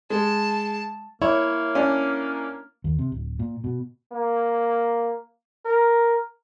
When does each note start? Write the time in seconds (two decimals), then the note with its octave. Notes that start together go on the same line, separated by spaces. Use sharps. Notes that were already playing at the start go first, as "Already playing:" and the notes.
0.10 G#3 A5
1.22 A#3 E4 C#5
1.75 C#4 D4
2.84 D#2
2.99 C3
3.12 D1
3.39 A#2
3.64 B2
4.12 A#3
5.66 A#4